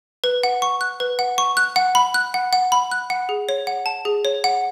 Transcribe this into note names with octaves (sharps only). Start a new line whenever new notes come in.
B4
F#5
C#6
F#6
B4
F#5
C#6
F#6
F#5
B5
F#6
F#5
F#5
B5
F#6
F#5
G#4
C#5
F#5
A5
G#4
C#5
F#5